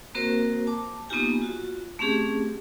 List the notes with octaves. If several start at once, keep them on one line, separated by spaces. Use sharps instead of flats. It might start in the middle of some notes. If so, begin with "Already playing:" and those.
A#3 C4 F#4 A#4 C5
A5 D6
A#3 B3 D#4 F4 G4 G#5
F4 F#4
A3 C4 C#4 G4 G#4